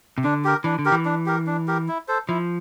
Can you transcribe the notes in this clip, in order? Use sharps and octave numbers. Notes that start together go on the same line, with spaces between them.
C3
D3 D4
G4 A#4
E3 D4
D3
G4 A#4
E3
D4
G4 A#4
D4
G4 A#4
E4
A4 C5
F3 E4